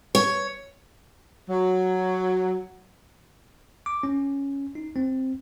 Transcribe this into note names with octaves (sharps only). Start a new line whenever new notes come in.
C#5
F#3
D6
C#4
D#4
C4